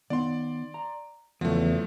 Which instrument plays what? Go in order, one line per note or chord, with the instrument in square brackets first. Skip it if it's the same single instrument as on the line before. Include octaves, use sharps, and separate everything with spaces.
[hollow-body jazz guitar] D#3 B3 D#4 [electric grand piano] D5 C6
[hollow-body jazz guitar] A#5
[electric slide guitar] E2 [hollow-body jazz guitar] C#3 F#3 [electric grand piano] F3 A3